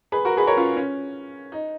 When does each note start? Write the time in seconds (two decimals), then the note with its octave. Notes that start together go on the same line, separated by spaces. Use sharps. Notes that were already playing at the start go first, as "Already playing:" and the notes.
0.12 G#4 B4
0.25 F#4 A#4
0.37 G#4 B4
0.47 A#4 C#5
0.57 C#4 F4
0.76 C#4
1.52 D#4